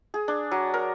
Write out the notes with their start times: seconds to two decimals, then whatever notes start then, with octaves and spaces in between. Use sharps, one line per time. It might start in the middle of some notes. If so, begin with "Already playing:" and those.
0.14 G#4
0.28 D4
0.51 F#3
0.74 A#4